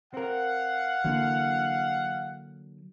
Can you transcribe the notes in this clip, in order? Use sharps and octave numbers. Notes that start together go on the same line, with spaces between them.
C4 A#4 F5 F#5
D3 E3 F#3 A#3